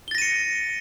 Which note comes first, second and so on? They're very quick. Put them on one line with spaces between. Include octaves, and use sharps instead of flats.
G7 A6 A#6 D#7 C#7